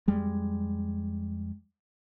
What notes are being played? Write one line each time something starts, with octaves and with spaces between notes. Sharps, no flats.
F2 G3 G#3